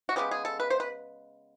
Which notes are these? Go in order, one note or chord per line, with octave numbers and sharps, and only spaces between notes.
F#4
C#3 E3 G#3 B3 G4
G#4
A4
B4
C5
B4